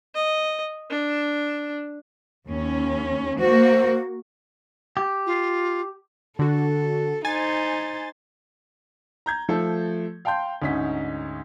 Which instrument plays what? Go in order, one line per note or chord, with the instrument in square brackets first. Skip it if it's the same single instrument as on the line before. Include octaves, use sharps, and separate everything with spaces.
[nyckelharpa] D#5
D4
[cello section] D#2 C#4
[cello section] A#3 F#4 [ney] C5
[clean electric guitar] G4
[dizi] F4
[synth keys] D3 F#4 [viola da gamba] A4
[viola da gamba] D#4 C5 [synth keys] G#5 A6
[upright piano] A#5 G6 G#6
F3 A3 A4
F5 G5 A5 C6 G6
D2 G#2 C#4 D#4 B6